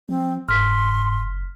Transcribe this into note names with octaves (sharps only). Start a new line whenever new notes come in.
F3 C4
F#1 G#2 C6 F6 B6